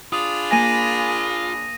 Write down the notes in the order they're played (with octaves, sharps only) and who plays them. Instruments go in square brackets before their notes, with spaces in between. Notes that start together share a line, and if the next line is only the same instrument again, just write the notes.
[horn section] D4 G#4 B5 [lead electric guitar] F4 [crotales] D#6
[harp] A#3 G#5 [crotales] A#6 D#7